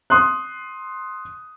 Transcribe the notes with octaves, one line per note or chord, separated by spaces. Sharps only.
C6 D#6 F#6